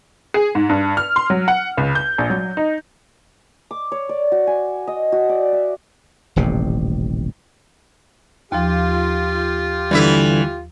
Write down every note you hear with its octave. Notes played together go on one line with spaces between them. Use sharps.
G#4
G#2
G2
F6
C6
F#3
F#5
C#2
G6
A#1
F#3
D#4
D6
C#5
D5
F#4
G#5
D#5
F#4
D5
E5
D#1 A1 C3
D#2 F3 F4 G4
D3 E3 G3 E4 E5